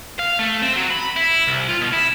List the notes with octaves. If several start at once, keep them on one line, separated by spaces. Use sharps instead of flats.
F5
A3
C4
F#3
B5
E4
C2
F4
B2
E4